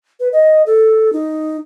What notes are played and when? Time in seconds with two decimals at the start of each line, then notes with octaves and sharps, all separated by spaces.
0.20 B4
0.33 D#5
0.66 A4
1.13 D#4